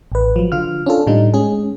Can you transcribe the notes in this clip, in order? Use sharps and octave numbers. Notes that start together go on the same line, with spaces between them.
A1 B4
F3 F#3
D3 F4 F6
C#4 D4 F4 A4
A2 D3 G3 D#4
G#3 C#4 G#4